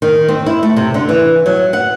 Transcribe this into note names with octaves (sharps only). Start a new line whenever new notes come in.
D#3
C4
E4
A3
C3
D3
E3
F#3
F#5